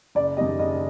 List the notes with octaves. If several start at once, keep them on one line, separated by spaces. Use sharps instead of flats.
F#1 D5
F#2 D#3 G3 D#5
F#1 D#5